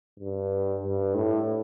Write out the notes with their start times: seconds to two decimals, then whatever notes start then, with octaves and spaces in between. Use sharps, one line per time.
0.19 G2
0.83 G2
1.15 A2